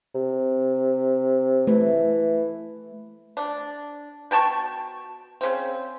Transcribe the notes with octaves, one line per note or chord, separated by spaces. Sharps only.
C3
E3 A3
D4
B2 G5 A5 C#6
C#3 C4